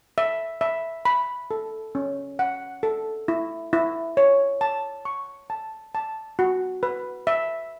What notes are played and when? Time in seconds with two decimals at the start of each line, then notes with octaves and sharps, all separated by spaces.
0.18 E5
0.61 E5
1.05 B5
1.51 A4
1.95 C#4
2.39 F#5
2.83 A4
3.28 E4
3.73 E4
4.17 C#5
4.61 A5
5.05 C#6
5.50 A5
5.95 A5
6.39 F#4
6.83 B4
7.27 E5